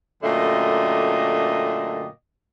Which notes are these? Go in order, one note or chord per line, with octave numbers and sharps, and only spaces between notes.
F#2 A#2 D3 A3 G4 D#5